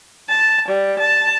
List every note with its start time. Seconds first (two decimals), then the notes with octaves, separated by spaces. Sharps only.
0.29 A5
0.68 G3
0.99 A5